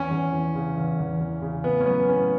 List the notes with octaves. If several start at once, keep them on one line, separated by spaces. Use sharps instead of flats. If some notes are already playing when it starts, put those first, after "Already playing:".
Already playing: E2 C#4
E2
E3
C#3
E2
E2
E3
C#3
A2 B3
C#4
F#3 B3
A2 C#4